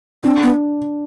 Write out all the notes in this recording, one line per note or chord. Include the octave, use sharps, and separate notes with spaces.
C4 D4
B3